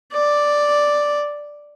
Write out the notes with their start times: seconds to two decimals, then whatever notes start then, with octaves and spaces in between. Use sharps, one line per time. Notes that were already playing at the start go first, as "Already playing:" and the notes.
0.13 D5